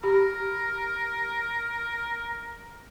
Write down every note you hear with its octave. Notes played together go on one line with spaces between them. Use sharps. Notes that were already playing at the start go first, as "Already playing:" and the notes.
G4 A#4 B5